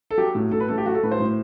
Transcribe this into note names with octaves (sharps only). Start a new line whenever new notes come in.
A4
F#3 G4
A2
A2 A4
B4
A3 A4
G4
F#3 F#4
A4
A2 B4
C5
A2